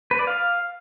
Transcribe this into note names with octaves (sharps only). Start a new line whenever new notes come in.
B4
D5
F5